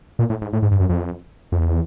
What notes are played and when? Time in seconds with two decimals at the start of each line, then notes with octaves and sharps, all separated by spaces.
0.19 A#2
0.30 A2
0.42 G#2
0.53 A2
0.62 G#2
0.71 G2
0.80 F#2
0.89 F2
1.52 F2
1.59 E2